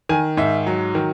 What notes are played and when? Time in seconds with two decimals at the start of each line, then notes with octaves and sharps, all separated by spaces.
0.09 D#3 G#5
0.37 G#2 E5
0.67 F#3
0.95 D#3